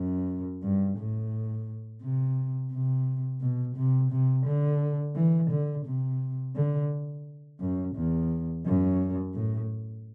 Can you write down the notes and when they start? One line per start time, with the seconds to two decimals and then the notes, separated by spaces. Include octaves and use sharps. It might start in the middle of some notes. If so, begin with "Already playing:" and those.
Already playing: F#2
0.63 G2
0.98 A2
2.02 C3
2.72 C3
3.41 B2
3.76 C3
4.11 C3
4.46 D3
5.16 E3
5.50 D3
5.86 C3
6.55 D3
7.60 F#2
7.95 E2
8.65 F#2
9.34 A2